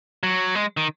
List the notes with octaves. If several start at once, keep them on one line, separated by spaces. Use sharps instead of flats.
F#3
G#3
D#3